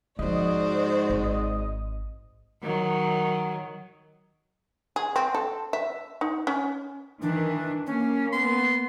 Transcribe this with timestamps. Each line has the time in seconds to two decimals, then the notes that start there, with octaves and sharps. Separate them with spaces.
0.19 G#2 F3 B3 F#4 C5 D5 D#5
1.10 G#1
2.62 D#3 F#3
4.96 G#4
5.16 C4
5.35 A4
5.73 E5
6.21 D#4
6.47 C#4
7.22 D#3 E3 D4
7.87 A#3 C#4
8.33 B3 C6